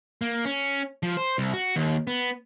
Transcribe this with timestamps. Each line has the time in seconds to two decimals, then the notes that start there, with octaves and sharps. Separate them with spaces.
0.22 A#3
0.45 C#4
1.03 F3
1.17 C5
1.38 C2
1.53 F#4
1.76 D#2
2.07 B3